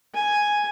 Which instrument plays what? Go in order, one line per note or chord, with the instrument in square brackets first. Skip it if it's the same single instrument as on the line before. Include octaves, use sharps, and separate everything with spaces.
[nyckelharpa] G#5